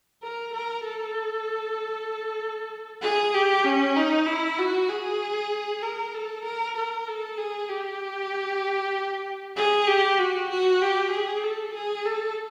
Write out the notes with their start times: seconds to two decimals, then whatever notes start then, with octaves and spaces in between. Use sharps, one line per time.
0.23 A#4
0.53 A#4
0.84 A4
3.02 G#4
3.34 G4
3.65 C#4
3.96 D#4
4.27 E4
4.59 F#4
4.89 G#4
5.83 A#4
6.14 A4
6.45 A#4
6.76 A#4
7.08 A4
7.38 G#4
7.69 G4
9.57 G#4
9.87 G4
10.18 F#4
10.50 F#4
10.81 G4
11.11 G#4
11.43 A4
11.74 G#4
12.05 A4